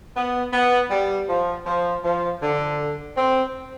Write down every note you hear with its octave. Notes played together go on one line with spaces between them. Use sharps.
B3
B3
G3
F3
F3
F3
D3
C4